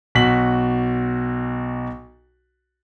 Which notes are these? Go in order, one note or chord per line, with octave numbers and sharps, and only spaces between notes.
B1 F#4 B6 F#7